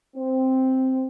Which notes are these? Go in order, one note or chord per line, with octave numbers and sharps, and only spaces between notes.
C4